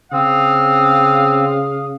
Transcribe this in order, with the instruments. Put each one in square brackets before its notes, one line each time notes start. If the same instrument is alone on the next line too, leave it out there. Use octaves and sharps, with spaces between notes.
[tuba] C#3 [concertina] C4 [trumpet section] F5 D#6